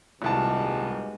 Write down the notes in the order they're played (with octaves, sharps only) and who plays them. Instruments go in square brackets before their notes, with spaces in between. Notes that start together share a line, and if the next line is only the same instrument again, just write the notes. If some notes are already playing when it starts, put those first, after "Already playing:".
[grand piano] D#1 C2 A5 [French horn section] G#2 B2 G#3